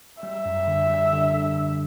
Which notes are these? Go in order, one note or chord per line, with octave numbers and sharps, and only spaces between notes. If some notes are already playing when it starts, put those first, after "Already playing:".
G3 E5
F#2
D3
G3
D3
D3
D3